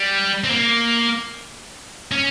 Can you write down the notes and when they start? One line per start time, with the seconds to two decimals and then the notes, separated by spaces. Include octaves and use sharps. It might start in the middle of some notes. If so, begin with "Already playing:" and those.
Already playing: G3
0.44 C4
0.50 A#3
2.12 C#4